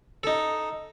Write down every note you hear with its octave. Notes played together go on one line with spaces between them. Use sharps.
D#4 A4